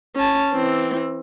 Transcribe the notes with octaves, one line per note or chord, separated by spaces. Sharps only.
C#4 A5
E3 C4